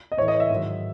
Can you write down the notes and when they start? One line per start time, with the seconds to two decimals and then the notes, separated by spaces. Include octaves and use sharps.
0.12 D#5
0.17 A2 E3 C#5
0.28 D#5
0.40 E5
0.50 G#2 D#3 F#3